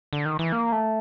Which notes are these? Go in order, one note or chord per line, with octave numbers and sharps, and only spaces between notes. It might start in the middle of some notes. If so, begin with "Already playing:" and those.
D3
D#3
E3
A#3
A3